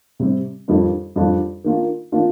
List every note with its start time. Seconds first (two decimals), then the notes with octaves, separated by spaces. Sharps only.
0.20 C3 G3 C4
0.68 F2 D#3 G3 D4 F4
1.16 F2 D#3 G3 D4 F4
1.64 D#3 A#3 D4 F4
2.12 D#3 A#3 D4 F4